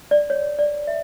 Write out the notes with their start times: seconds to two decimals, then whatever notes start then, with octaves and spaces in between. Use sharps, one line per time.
0.11 D5
0.30 C#5
0.59 D5
0.87 E5